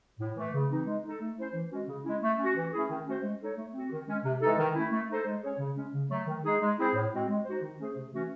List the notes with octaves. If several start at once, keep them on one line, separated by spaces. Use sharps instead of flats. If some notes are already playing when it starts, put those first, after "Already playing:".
A2
E3 A3
C#3
E3 C4 D#4
G#3
D#4 A4
A3
C#4 E4 C5
E3
G#3 C#4 F#4
C#3
G#3 C#4 E4
A3
C#4 F#4
E3
A3 C#4 E4 G#4
D#3
A3 C#4 F#4 C5
G#3
D#4 A4 C#5
A3
C4 F#4
D#3
G#3 C#4
C3
E3 G#3 D#4 A4
D#3
A3 C#4 E4
A3
D#4 A4 C5
G#3
C#4 G#4 C#5
C#3
G#3 C#4
C#3
F#3 A3
D#3
G#3 D#4 G#4
G#3
C4 E4 G#4 C5
A2
G#3 C4 F#4
G#3
D#4 F#4 C5
D#3
A3 C#4 G#4 C5
C3
E3 A3 C#4 F#4